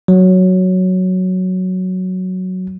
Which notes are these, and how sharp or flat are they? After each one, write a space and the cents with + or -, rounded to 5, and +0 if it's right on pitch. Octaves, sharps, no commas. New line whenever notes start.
F#3 +0